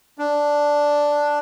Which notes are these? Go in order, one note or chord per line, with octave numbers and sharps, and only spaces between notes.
D4